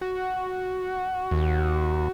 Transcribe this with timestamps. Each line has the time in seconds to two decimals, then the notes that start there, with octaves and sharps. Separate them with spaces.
0.01 F#4
1.31 D#2